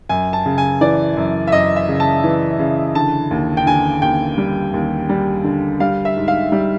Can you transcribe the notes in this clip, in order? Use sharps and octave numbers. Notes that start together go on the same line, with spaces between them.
F#2 G#5
A5
C#3
G#5
E3 D5
F#2
E5
F#2 D#5
E5
C#3
A5
E3
C#3
D3 A5
D#2
G5
D3 G#5
D#2 G5
G3
D#2
G3
D3
G3 F5
E5
G#2
F5
G3